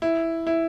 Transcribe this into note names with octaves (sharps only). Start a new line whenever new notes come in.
E4
E4